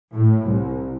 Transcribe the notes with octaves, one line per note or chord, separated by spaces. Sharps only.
A2
C2